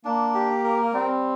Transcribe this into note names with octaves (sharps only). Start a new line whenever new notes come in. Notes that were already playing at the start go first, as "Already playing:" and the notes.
A#3 D4
G4
A#4
G3 C4